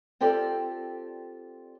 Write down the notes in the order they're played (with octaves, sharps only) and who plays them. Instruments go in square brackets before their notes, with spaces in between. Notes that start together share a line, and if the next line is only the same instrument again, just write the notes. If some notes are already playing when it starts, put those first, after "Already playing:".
[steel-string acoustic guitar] C4 F4 G4 A4 D5